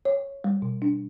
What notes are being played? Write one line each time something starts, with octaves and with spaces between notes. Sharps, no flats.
C#5
G3
B2
D4